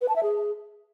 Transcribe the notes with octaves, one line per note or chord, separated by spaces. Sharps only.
B4
A5
E5
G#4